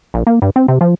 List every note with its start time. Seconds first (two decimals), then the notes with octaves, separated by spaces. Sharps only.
0.14 A#1
0.27 A#3
0.42 G2
0.56 C4
0.68 C3
0.81 F3